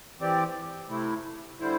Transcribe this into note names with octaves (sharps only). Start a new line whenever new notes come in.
E3 C4 G4 D5
C3 A3 E4
D3 G3 E4 C5